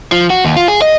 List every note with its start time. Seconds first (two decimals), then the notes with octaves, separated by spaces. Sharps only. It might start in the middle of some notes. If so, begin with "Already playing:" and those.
0.12 F3
0.30 F#4
0.45 D#2
0.56 F4
0.68 G#4
0.82 D#5